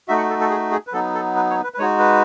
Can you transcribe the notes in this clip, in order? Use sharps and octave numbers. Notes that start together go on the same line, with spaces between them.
A3 D#4 F#4 E5
F#5
A4
A4
G#4
G#4
B4
F#3 B3 D#4 A4
A4
B4
C#5
B4
B4
G#3 D#4 F#4 C#5
B4